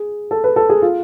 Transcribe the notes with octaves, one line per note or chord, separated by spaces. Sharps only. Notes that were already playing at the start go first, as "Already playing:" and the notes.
Already playing: G#4
A4
B4
A4
G#4
F4